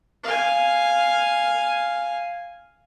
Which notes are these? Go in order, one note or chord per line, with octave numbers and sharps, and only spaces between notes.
F5 G#5